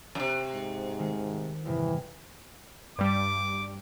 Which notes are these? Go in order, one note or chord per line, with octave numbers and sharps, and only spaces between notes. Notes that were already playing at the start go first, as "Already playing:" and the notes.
F#2 C3
G#2
D#3 G#3 A3
E2 G2 C3 E3
G2 G3 D6